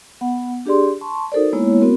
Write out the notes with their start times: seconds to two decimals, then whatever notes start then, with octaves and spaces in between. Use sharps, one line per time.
0.21 B3 F#5
0.66 D4 G4 G#4 D5 C6
1.01 A5 C6 C#6
1.32 D#4 F#4 A4 A#4 C5 D5
1.53 G#3 A#3 B3 E4 C#5
1.81 B3 C4 F#4 A#4